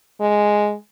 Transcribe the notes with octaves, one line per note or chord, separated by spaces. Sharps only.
G#3